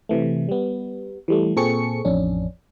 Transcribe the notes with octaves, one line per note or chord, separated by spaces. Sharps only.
C3 E3 A3
G3 B3
E3 G3 A3
A#2 C4 G#4 A4 C#6 C#7
A1 F2 C#4 D4